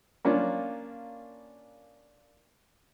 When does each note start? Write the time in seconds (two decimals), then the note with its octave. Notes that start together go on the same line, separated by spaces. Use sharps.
0.25 A#3 C#4 D4 F4